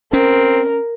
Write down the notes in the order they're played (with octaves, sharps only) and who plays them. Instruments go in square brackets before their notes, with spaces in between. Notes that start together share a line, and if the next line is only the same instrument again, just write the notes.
[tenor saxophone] C4 [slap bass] C#4 [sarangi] A#4